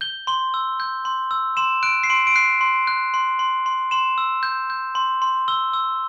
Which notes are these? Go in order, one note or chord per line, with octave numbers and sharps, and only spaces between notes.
G6 G7
C6 G7
E6
G6
C6
E6
C6 E7
F#6 D7
C7
C6 D7
D7
F#6 C7
C6
F#6
C6
C6
C6
C6 E7
E6
G6
G6
C6
C6
E6 G7
E6